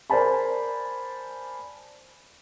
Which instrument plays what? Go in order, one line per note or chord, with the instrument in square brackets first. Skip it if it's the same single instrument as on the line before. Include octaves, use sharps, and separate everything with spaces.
[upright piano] A#4 C5 D5 G#5 A5 B5